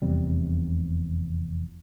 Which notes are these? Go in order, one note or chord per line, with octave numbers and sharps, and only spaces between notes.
F1 E2 C3 G3